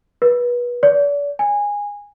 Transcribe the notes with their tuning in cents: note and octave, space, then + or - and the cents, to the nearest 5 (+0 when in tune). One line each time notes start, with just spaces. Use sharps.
B4 -25
D5 -40
G#5 -15